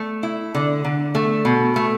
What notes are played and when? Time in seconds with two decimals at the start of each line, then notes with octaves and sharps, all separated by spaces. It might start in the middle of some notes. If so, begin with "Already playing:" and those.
Already playing: A3
0.23 E4
0.55 D3
0.84 D3
1.15 A3
1.45 B2
1.76 A3